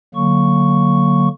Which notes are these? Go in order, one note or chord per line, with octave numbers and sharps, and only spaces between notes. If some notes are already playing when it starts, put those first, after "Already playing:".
D3 F#3 A#3 C#6